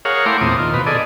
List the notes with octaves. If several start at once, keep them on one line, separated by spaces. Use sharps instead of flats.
G#4 A#4 C#5 F5 F#5
A3 E4 G5 A#5 C6 D6
E2 A#2 C4 D#6
D#3 F4
B2 B4
G#4 A4 D5 D#5